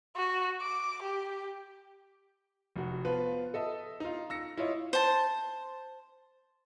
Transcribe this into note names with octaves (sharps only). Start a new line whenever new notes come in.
F#4
D6
G4
F1 F#4
F3 B3 F4 B4
A4 D#5 E5
D#4 F4
E6 A#6 C#7
E4 F4 C#5 D#5
C5 A5